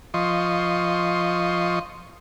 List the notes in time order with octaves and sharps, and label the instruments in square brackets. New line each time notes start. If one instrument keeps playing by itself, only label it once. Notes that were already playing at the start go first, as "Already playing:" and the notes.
[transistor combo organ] F3 D#5 C6 C#6